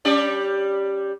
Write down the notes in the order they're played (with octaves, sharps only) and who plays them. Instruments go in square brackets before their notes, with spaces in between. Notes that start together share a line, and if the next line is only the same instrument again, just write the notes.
[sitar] G3 C#4 D5